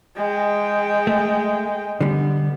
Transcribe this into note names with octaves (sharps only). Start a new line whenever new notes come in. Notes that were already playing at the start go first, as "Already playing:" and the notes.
G#3 G5
A3
D3 G3 B3